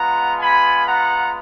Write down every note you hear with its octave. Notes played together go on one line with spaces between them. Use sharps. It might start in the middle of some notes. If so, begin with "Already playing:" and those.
Already playing: G#3 B3 F4 F#5 A#5
G#5 B5
F#5 A#5